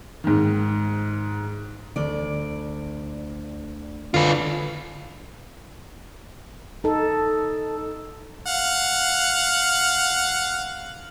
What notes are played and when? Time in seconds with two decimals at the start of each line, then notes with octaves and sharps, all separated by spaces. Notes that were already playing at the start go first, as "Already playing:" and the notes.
0.24 G#2 D#3
1.96 D2 D5
4.14 D3 F4 B4
6.84 D#4 A4
8.46 F5 F#5